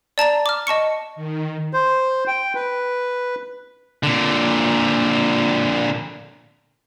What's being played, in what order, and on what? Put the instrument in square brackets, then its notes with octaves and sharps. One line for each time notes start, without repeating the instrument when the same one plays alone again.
[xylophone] D5 A5 A#5 A6
D6 F6
D#5 A5 C#6 C#7
[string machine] D#3
[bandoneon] C5
G5
B4
[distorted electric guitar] A#2 D3